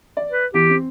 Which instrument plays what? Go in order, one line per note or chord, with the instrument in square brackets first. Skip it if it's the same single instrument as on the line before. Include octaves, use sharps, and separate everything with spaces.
[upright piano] D5
[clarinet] B4
[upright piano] E2 [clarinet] G4
[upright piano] C4